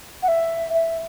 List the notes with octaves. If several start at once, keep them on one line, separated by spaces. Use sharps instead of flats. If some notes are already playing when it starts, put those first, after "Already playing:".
F#5
E5
E5